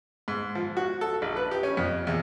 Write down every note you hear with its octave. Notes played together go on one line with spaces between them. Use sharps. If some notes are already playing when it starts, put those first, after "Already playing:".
G#2
F3
F#4
A4
A#1
B4
G4
C#4
F2
E2